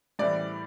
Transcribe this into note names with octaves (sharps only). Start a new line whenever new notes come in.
A2 E3 G3 C4 E4 D5